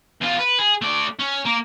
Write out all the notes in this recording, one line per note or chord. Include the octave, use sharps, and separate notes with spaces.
E2 F4
B4
G#4
A3 D5
C#4
A#3